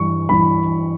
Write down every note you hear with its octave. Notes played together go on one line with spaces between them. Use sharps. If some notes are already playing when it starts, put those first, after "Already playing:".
Already playing: G2 E3 C#6
G2 E3 B5